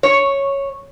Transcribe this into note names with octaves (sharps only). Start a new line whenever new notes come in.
C#5